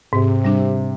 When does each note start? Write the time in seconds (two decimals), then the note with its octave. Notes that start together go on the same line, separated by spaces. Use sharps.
0.13 G#2 C3
0.45 G3 D4